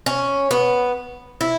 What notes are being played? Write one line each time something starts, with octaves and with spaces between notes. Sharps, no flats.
C#4
B3
E4